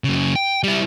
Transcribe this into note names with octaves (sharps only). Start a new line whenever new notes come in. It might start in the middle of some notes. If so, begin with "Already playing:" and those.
F#2 C#3
G5
G3 E4